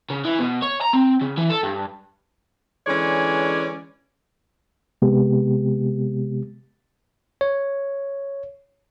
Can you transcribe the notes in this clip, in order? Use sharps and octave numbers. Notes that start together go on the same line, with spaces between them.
C#3
E3
B2
C#5
A#5
C4
C#3
E3
A4
G2
D3 E3 G#3 C#4 C#5 D5
C3 G#3 B3 G4
C#5